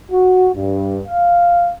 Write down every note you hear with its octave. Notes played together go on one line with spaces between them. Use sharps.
F#4
G2
F5